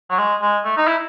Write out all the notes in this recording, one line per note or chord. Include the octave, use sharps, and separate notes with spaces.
F#3
G#3
G#3
A3
D#4
E4